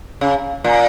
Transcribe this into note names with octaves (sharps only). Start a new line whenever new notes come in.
C#3
A#2